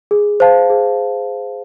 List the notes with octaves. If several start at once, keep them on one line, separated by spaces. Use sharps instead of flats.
G#4
C5 F5 A5
G#4